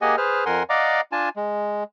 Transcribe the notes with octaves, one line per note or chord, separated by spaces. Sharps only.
A#3 G4 G#4 D#5 F#5 G#5
G#4 B4 C5 F6
F2 A#4 F#5 G#5 C6
D5 D#5 F5 F#5 A#5 D6
D4 F4 G#5 A5
G#3